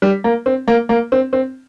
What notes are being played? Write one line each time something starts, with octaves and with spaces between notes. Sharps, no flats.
G3
A#3
C4
A#3
A#3
C4
C4